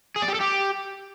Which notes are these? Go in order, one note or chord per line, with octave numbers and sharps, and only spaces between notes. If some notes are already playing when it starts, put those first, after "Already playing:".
G#4
D5
G4
A4
G4